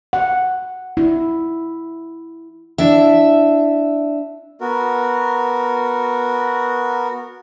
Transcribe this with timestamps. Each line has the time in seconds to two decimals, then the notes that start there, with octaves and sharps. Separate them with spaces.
0.13 F#5
0.97 E4
2.78 D4 E4 E5
4.61 B3 F#4 A#4